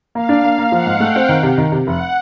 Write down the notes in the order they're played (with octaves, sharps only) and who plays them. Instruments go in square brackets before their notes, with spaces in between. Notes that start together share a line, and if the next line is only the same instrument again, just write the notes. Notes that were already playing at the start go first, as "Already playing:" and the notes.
[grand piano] A#3 [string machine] F5
[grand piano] D4
A#3
A#3
[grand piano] F3 [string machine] F#5
[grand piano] G#2
[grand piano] A3 [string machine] G5
[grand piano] C4
D#3
C3
D#3
C3
[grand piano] F1 [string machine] F#5